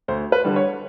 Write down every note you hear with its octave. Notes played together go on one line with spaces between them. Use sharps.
D2 C5
B4
D3 G3
C#5